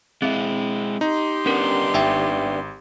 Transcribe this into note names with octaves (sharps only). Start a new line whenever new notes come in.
G#3 C4 E4
D#4 G4 C6
B3 C#4 D4 A#4
G#1 D#4 E5 G5